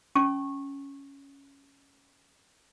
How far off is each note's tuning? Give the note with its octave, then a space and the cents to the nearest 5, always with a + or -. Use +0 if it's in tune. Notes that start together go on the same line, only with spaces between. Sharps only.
C#4 +0 A5 -45 C#6 -20